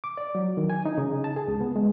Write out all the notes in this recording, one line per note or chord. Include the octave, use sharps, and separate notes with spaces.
D6
D5
F#3
D#3
G#5
D#4
C#3
A5
G#4
C#2
B3
G#3